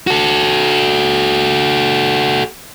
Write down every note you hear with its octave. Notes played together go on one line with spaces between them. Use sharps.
F#4 A4